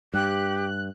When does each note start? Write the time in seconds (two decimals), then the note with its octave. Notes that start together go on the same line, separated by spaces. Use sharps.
0.14 G2 G4 F#6